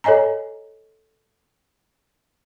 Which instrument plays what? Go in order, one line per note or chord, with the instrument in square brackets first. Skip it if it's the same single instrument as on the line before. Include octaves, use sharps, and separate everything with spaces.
[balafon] A4 C#5 D#5 G#5 A#5